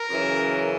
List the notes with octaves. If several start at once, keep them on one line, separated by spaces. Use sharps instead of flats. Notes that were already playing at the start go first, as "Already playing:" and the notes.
Already playing: A#4
F#2 C#3 E3